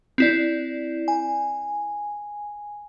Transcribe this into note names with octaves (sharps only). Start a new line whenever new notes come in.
C4 E4 D5
G#5